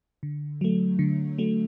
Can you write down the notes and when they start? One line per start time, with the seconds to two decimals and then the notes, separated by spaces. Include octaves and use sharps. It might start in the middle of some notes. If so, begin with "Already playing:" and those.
0.23 D3
0.61 F#3 A3
0.99 D3
1.38 F#3 A3